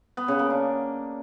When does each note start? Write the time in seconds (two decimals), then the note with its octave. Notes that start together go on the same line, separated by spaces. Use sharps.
0.17 B3
0.28 C#3
0.39 A#3
0.50 D4